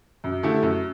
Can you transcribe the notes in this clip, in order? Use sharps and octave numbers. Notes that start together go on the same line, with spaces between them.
F#2
D3 A3 E4 G4
F#2